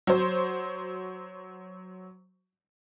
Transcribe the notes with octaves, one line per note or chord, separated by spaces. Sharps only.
F#3 C5